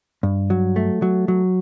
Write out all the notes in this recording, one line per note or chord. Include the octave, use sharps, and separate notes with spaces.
G2
F#3
A3
F#3
F#3